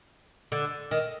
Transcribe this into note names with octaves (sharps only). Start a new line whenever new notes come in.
D3
D#3